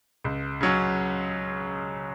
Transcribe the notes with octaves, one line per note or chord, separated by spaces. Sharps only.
C#2
C#3 F#3 C#4